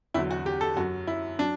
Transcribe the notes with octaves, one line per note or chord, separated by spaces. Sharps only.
E2 D3 F#3 E4
F#4
G4
A4
F#2 F#3 F#4
E4
F#3 D4